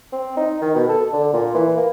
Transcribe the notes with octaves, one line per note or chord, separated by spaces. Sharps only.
C4
D#4
D#3
B2
A4
D3
A#2
E3
A#3